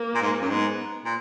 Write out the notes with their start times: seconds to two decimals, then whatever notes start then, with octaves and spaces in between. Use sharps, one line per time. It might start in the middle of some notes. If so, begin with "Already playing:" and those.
Already playing: A#3
0.15 A#2
0.22 G#2
0.41 F#2
0.49 G#2 B3
1.05 A#2